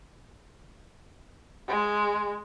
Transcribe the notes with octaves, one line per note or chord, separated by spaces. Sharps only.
G#3